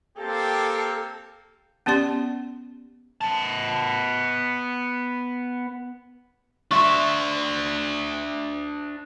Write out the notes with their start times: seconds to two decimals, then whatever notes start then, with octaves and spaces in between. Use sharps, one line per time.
0.18 A#3 C4 G4 A4
1.86 B3 C#4 G4 D5 C6
3.21 B3 A5
6.71 D4 E5 C6 C#6